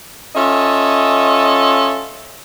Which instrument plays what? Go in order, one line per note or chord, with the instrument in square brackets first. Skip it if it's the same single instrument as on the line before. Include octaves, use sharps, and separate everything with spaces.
[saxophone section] C#4 F4 A4 D#5 E5